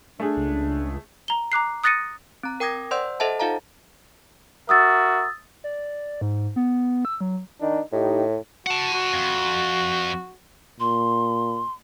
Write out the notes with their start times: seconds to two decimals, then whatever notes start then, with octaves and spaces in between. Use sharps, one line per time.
0.20 A3 D4 G#4
0.37 C#2
1.28 A#5 G7
1.52 A#5 D6 F#6 C7
1.84 D#6 F#6 A6 A#6 C#7 D#7
2.43 C4 A#5
2.60 A#4 G5 D6 D#6 G#6 A#6
2.91 C5 D5 F#5 C6 E6 G6
3.20 A4 C5 D#5 E5 F#5 A5
3.39 D#4 F4 E5 F5 A5 A#5
4.69 F#4 A#4 E5 D#6 E6 A6
5.64 D5
6.21 G#2
6.56 B3
7.05 E6
7.21 F#3
7.61 D#3 D4 D#4
7.92 A2 D#4 G4
8.67 F#4 F#5 A5
8.93 F#4
9.13 F2
10.80 A#2 C6